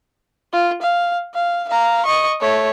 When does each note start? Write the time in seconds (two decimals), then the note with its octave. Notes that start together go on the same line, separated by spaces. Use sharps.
0.53 F4
0.82 F5
1.35 F5
1.69 F5 A#5
2.05 D#5 C#6
2.41 A3 C#5